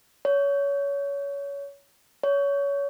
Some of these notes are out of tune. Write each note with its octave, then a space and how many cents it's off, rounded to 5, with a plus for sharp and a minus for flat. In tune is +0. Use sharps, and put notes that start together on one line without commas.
C#5 +25
C#5 +25